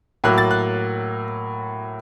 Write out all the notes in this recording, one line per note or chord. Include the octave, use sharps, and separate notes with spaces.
A2 F#3 A#3 F#6
A6
F#6